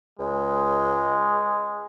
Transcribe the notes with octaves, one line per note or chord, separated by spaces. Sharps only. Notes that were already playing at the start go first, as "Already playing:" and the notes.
C#2 G#3